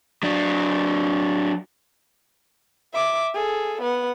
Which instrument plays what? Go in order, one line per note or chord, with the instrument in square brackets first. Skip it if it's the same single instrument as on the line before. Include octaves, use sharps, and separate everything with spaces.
[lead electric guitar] F#3 D4
[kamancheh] E5 D6
G#4 A4
B3 F#5